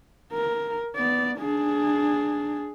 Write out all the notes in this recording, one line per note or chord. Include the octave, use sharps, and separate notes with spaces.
A#4
B3 D5
D4 G#4